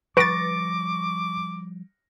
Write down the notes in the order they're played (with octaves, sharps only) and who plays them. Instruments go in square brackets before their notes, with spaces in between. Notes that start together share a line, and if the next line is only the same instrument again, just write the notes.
[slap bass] F3 G3 [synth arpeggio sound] B4 A6 [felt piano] C#6 A#6 D7 [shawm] D6